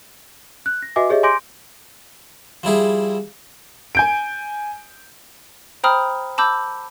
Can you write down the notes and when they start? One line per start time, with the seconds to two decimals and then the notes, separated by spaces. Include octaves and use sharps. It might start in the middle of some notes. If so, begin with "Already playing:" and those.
0.66 F#6
0.82 A#6
0.96 F#4 B4 D#5 E5 G#5 D6
1.10 G4 G#4 C#5 D#5 E5
1.23 G#5 C6 D6 G6 A#6 D7
2.63 F3 G3 E4 G#4
3.95 G#5 G6 D7
5.84 C5 G5 A#5 B5 D#6 F6
6.38 A5 B5 D6 E6 G6